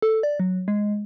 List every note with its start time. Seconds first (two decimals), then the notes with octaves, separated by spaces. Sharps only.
0.02 A4
0.23 D5
0.40 F#3
0.68 G#3